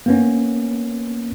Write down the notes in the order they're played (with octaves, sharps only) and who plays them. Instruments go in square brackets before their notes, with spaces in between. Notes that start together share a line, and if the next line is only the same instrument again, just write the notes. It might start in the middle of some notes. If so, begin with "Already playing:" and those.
[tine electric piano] A#3 B3 C#4